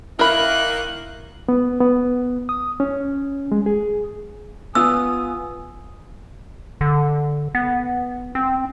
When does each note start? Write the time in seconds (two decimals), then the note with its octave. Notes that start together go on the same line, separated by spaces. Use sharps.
0.19 D#3 A#3 E4 A#4 B5 F#6
1.48 B3
1.80 B3
2.49 D#6
2.80 C#4
3.52 G#3
3.66 G#4
4.75 B3 F4 G#5 D#6 E6
6.81 D3
7.55 B3
8.35 C4